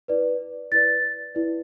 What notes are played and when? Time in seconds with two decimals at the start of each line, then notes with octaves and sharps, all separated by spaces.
0.08 E4 B4 D5
0.72 E4 B4 D5 A6
1.35 E4 B4 D5